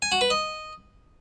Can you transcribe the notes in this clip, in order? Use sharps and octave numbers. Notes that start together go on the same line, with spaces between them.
G#5
F#4
B4
D#5